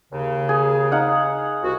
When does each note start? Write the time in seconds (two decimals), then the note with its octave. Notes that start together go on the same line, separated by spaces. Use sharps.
0.11 D#2 C#3
0.49 G#4
0.92 D#4 F5 F#5
1.62 C2 F#4